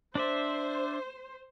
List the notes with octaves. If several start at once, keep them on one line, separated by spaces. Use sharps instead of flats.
D4 C5 D5 E5